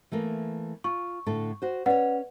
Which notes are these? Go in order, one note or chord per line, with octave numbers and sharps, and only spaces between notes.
E3 A3 A#3
F4 C#6
A2 D3 A4
F#4 C5
C#4 B4 C#5 D5 F#5